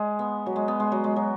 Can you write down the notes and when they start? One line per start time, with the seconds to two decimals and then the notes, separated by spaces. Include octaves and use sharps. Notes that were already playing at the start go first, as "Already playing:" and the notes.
Already playing: G#3
0.19 B3
0.46 F#3
0.56 G#3
0.68 B3
0.80 G#3
0.92 F#3
1.04 G#3
1.16 F#3